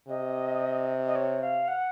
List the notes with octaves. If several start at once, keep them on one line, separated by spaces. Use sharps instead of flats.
C3 D#5
D#5
C#5
F5
F#5